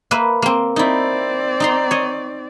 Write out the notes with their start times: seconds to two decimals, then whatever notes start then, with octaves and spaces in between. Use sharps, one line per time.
0.11 A#3 B4 E5
0.42 A#3 C4
0.76 C4 D#4 E4 D5
1.60 D#4 A#5 C6
1.91 C#5 D#5